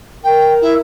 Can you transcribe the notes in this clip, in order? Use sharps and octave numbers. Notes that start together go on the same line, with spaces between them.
A#4 G5
E4